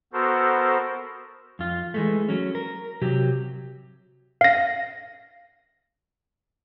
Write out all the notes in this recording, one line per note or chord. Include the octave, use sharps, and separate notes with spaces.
B3 F#4 A4 A#4 C5
F2 F4
E3 G#3 A3
F#3 C#4
A#4
C3 F#3 G4
F5 A#6